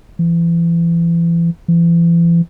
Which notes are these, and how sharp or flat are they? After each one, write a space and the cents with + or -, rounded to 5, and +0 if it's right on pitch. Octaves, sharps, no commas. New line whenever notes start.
E3 +35
E3 +40